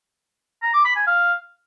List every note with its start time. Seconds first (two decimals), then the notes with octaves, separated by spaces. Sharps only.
0.62 A#5
0.74 D6
0.85 B5
0.96 G#5
1.07 F5